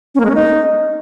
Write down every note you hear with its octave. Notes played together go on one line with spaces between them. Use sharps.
C#4
A#3
G#3
C#4
D#4